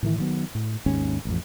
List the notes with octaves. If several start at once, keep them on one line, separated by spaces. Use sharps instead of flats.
A2 D#3 E3
D#3 F#3 B3
A2
G#1 D#2 G#2 C#4
A1 F2